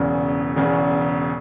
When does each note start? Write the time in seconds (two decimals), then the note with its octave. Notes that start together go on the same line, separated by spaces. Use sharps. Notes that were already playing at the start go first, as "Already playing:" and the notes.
Already playing: E1 E2 C#3
0.56 E1 E2 C#3